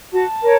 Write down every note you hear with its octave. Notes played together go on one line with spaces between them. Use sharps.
F#4 A5
A#4 C#5